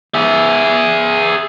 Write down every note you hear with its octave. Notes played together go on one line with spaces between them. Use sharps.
G#4 E5